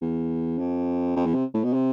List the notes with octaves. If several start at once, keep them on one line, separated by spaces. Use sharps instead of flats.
E2
F2
F2
E2
C3
A2
B2
C3